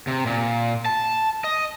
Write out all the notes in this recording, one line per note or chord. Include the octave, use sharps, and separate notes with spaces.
C3
A#2
A5
D#5